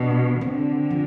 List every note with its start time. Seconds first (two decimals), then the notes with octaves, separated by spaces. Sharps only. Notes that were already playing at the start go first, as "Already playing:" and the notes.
Already playing: B2 D4
0.41 D3 C4
0.91 F3